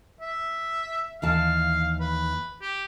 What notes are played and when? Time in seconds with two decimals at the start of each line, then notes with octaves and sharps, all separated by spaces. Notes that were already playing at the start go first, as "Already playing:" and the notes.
0.21 E5
1.22 D#2 E3 F5 A5
2.00 B4
2.62 G4